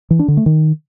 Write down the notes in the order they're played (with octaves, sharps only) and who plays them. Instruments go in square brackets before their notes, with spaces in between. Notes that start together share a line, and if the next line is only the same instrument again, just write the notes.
[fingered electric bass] E3
D4
D3
A3
D#3